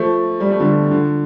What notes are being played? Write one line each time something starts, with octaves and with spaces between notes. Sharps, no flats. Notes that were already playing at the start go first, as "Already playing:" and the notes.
Already playing: F3 A3
G3
A3
D3 G3
D3